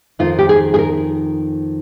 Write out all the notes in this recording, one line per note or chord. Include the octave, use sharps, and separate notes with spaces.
F2 D#3 F4
G4
G#4
G#4
A#4